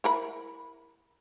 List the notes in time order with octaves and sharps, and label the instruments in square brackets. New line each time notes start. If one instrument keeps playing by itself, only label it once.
[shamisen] E4 A#4 B5